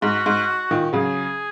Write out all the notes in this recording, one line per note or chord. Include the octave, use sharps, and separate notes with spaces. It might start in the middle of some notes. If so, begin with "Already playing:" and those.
G#2 F#4
G#2
A#2 D#3
C#3 F#3 G#4